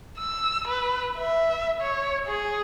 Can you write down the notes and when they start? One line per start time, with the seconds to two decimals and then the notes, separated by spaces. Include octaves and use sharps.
0.18 E6
0.68 B4
1.17 E5
1.81 C#5
2.27 G#4